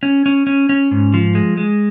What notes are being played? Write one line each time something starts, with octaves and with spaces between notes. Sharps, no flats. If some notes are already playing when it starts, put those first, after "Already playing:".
C#4
C#4
C#4
C#4
G#2
F3
G#3
G#3